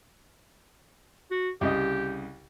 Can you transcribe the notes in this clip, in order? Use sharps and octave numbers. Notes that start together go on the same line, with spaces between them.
F#4
C2 C#3 G4 D#5